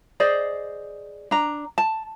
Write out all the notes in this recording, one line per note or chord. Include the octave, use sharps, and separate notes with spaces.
G#4 C5 D5 D#5
D4 A#5
A5